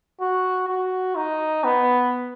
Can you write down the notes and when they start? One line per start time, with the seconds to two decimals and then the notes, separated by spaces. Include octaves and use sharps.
0.21 F#4
0.68 F#4
1.16 D#4
1.64 B3